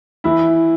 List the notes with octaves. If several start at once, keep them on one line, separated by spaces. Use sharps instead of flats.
E3 E4